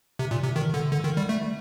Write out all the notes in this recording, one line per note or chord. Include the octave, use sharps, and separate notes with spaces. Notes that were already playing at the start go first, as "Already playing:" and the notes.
C3
A#2
C3
D#3
D3
D3
D#3
G3
A3